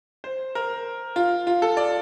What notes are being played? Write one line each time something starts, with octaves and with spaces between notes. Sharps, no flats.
C5
A#4
F4
F4
A4
D5